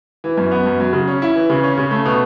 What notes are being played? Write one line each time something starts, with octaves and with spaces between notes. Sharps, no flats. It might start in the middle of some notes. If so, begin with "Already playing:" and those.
E3
F#2
B3
F#2
F#3
C#3
C#4
E4
E3
C#3
C#4
C#3
A3
B2